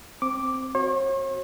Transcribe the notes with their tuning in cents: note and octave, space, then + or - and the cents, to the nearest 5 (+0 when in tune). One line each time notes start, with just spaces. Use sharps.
C4 +0 D6 +0
F#4 +0 C#5 -45